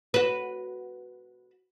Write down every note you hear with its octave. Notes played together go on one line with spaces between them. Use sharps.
F#4 B4